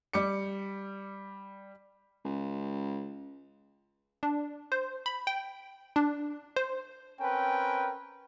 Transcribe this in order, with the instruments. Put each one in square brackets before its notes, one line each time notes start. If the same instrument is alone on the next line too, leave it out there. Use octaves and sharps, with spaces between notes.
[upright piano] G3 D6 C#7
[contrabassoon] C#2
[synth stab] D4
C5
B5
G5
D4
C5
[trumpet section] C4 C#4 A#4 B4 G5 G#5